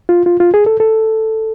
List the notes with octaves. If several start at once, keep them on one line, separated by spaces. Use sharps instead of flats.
F4
F4
F4
G#4
A4
A4